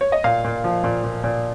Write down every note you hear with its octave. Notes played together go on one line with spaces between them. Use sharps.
C#5
D#5
A#2 F5
A#2
F3
A#2
A#2
A#2